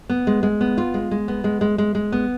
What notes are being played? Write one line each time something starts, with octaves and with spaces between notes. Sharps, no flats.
B3
G#3
G#3
B3
F4
G#3
G#3
B3
G#3
G#3
G#3
G#3
B3